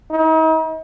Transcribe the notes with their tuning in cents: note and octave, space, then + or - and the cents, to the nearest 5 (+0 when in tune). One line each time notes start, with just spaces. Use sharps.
D#4 +40